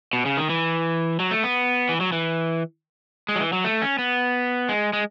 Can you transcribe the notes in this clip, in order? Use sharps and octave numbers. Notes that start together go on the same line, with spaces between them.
B2
C#3
D#3
E3
F#3
A3
B3
E3
F#3
E3
G#3
F#3
E3
F#3
A3
C#4
B3
G#3
G#3